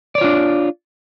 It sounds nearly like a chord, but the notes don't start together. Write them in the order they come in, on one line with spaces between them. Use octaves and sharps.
D5 C#5 F4 D4